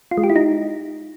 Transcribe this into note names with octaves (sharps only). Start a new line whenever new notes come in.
F4
G#3
G4
E4
D#4